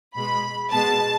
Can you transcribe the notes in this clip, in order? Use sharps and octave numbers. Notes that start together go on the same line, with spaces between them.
B2 G#3 B5
B2 G#3 A5